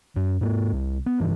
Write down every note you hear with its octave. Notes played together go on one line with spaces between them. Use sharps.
F#2
G#2 A#3
C2
B3
F1 G2 E3